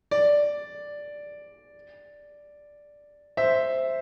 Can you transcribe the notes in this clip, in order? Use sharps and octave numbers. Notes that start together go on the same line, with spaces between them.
D5
C5 E5